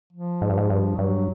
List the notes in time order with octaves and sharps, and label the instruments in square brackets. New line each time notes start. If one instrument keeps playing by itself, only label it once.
[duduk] F3
[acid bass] G#2
G2
G#2
G2
[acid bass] G2 [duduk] F#3